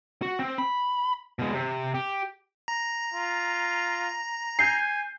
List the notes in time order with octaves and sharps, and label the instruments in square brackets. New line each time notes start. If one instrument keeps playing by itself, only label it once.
[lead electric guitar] F#4
C4
B5
B2 G#3
C3
G4
[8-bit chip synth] A#5
[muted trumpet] F4
[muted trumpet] G#5 [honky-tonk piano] G6 C7